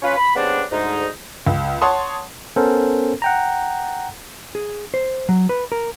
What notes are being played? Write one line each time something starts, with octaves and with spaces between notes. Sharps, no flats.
C#4 F4 B4
B5
C#3 G3 B3 C4 D4
D2 G#2 D#4
C#2
C#5 F#5 A5 C6 D#6
B3 C#4 A4 A#4 C5
F#5 G5 A#5
G#4
C5
F#3
B4
A#4